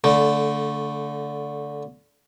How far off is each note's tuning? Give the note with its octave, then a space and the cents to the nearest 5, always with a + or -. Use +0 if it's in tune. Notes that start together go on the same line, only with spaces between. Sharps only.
D3 -20 A3 +0